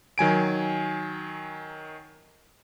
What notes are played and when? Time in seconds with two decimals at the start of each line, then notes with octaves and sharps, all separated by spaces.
0.18 D#3 F#3 G#5 D7